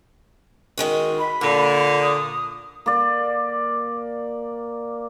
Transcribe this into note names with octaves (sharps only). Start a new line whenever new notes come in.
D#3 G#3 F#4
B5
A#2 D3 A#3
D#6
A#3 D5